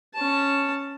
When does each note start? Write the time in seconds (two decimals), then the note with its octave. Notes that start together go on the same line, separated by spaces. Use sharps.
0.14 C#4 A5